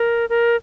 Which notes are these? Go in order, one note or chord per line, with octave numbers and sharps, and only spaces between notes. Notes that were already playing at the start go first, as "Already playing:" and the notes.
Already playing: A#4
A#4